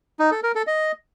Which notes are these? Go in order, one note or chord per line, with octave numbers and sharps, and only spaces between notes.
D#4
A4
A#4
A4
D#5